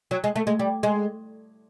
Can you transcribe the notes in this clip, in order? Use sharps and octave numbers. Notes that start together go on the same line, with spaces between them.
F#3
G#3
A3
G#3
G3
G#3